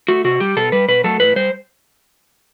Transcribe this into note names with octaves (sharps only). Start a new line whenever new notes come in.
A3 F#4
C3 F#4
G3 G4
B2 A4
G3 B4
B2 B4
F#3 A3 A4
A2 B4
G3 C5